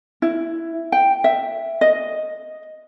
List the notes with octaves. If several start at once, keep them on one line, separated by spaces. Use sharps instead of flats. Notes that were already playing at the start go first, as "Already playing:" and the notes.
E4
G5
E5
D#5